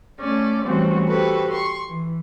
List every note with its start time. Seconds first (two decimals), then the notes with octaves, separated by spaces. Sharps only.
0.19 A3 C#4 D5
0.63 E3 G3 A3 C4 C#4 F#4
1.06 F#4 G4 A4 B4 C5
1.51 C6 C#6
1.87 E3